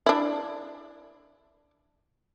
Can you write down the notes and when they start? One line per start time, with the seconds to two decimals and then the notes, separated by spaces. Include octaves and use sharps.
0.06 D4 E4